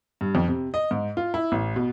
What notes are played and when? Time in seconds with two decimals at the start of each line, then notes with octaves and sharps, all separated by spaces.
0.21 G2
0.35 F2
0.48 C3
0.74 D#5
0.91 G#2
1.17 F4
1.34 E4
1.52 A1
1.76 B2